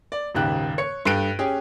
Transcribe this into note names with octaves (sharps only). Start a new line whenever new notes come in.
D5
D#1 D#2 G#2 C#3 G4 F#6
C#5 C#7
G2 A4 G5 F#6 D7 D#7
C#4 G4 G#4